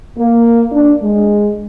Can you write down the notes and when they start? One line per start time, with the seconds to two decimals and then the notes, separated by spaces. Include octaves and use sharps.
0.18 A#3
0.72 D4
1.02 G#3